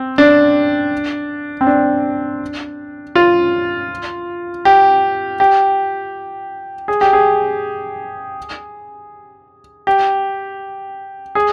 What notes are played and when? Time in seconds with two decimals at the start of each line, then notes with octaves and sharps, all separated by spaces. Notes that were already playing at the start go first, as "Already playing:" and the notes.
Already playing: C4
0.18 D4
1.61 C4
1.67 D4
3.15 F4
4.65 G4
5.40 G4
6.88 G#4
7.01 G4
7.13 G#4
9.87 G4
11.35 G#4